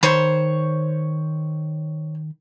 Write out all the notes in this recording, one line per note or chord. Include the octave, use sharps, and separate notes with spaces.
D#3 C5 C#5 B5